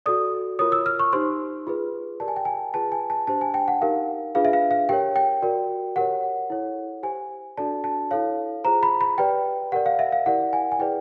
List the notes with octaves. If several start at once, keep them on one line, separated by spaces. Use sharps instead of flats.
F#4 A4 D5 D#6
F4 A#4 C#5 D#6
E6
F6
C#6
D#4 G4 C5 C6
F4 G#4 B4
G4 A#4 D5 A5
G#5
G5
G#5
F4 G#4 B4 A5
G#5
A5
D4 G4 C5 A5
G#5
G5
F#5
D#4 G4 A#4 F5
D4 F4 G#4 B4 F5
E5
F5
F5
G4 A#4 C#5 G5
G5
F#4 A#4 D5
G4 A#4 C#5 F#5
E4 A4 C#5
G4 C5 G#5
D4 F#4 A4 D5 A5
A5
E4 A4 C#5 F5
F4 G#4 C5 A#5
B5
B5
G4 B4 D5 G5
G4 A#4 D5 F#5
F5
E5
F5
E4 G4 A#4 D5 F#5
G#5
G#5
E4 G#4 B4 D5 G5